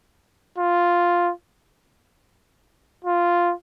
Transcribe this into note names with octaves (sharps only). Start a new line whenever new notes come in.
F4
F4